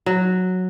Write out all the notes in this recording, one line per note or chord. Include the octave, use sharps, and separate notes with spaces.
F#3